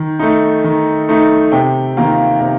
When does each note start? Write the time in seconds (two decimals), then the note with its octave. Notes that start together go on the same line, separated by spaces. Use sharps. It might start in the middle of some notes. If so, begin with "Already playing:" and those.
Already playing: D#3
0.19 A3 D#4
0.64 D#3
1.09 A3 D#4
1.52 C3 G5
1.97 D#3 A#3 F4
2.41 C3